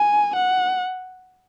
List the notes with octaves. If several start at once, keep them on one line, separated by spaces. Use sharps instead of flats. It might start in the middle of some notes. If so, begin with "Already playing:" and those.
Already playing: G#5
F#5